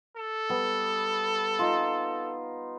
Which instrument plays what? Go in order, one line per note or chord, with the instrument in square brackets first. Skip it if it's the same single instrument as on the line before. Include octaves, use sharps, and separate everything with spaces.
[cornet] A4
[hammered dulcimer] G3 B3
D#4 F4